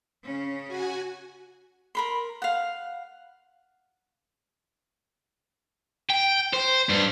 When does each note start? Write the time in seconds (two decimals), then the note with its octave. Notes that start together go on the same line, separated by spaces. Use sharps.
0.23 C#3 C#4
0.68 F#4 G#5
1.95 A#4 B5 C6
2.42 F5 F#5
6.10 G5
6.54 C5
6.89 G2